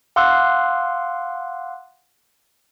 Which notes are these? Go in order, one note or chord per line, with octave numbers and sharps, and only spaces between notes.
F5 F#5 C6 D6 E6 F#6